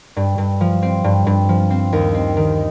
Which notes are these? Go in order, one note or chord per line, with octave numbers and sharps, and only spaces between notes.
G2
G2
F3
C4
G2
G2
F3
C4
D#2
C4
D#3